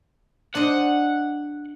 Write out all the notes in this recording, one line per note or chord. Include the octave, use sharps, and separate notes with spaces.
D4 C5 D#5 F#5